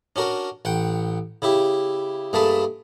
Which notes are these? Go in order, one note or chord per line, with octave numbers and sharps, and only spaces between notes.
C#4 D4 F#4 A#4
A1 F#5 G5
C#3 E4 G4
G2 A3 A#3 G#4 A5 B5